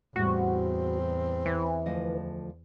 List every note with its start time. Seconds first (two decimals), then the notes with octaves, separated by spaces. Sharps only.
0.16 E2 A2 G3 C4 F#4
1.46 E3
1.86 D2 F3 D#5